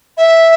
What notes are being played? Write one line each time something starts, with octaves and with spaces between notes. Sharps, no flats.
E5